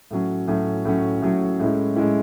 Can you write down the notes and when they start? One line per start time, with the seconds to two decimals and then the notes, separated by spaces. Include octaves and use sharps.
0.11 A2 F#3 C#4
0.48 A2 F#3 C#4
0.85 A2 F#3 C#4
1.22 A2 F#3 C#4
1.59 A2 G#3 C#4 E4
1.96 A2 G#3 C#4 E4